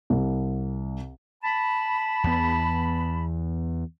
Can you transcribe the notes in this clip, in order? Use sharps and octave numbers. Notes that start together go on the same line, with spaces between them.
C2
A5 B5
E2 B3